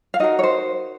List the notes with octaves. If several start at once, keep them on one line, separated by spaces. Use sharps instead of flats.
F5
D#4 F#4 A#4 D#5
C#5
C5